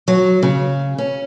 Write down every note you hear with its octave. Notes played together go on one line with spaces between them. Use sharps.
F#3
C#3
C#4